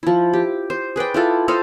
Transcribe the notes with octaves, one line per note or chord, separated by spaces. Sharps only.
F3 E4
G4
C5
G#4 B4 D5 G5
E4 F4 A4
A4 C5 D#5 F5